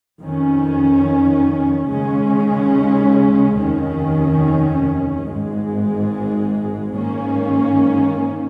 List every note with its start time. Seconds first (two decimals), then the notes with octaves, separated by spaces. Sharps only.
0.20 F2 D#3 C#4
1.88 D#2 C#3 G#3 C#4
3.57 F1 D#2 D#3 C#4
5.26 G#1 G#2 G#3
6.94 G#2 D#3 A#3 C#4